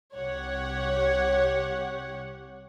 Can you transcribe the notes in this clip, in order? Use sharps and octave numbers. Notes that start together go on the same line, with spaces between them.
C2 G4 C#5 F#5